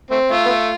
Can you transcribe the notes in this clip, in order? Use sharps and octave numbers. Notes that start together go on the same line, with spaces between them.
A3 C4
A3 F4
B3
A3